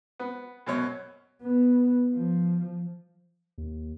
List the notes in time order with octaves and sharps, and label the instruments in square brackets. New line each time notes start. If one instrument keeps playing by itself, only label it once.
[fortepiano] B3
F#2 B2 C#5
[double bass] B3
F3
[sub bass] D#2